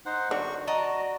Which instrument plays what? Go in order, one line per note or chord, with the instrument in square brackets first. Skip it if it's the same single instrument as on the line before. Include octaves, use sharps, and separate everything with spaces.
[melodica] D#4 C5 F#5
[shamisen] D3 F#3 D4 [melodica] F#4 C#6
[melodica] F#4 A5 [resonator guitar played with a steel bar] D5 D#5 A#5